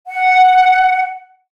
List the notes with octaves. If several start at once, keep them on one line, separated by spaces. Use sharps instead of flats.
F#5